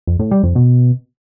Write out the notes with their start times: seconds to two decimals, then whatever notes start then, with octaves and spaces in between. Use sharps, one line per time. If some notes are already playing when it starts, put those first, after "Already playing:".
0.07 F2
0.19 A2
0.31 G3
0.43 F2
0.55 B2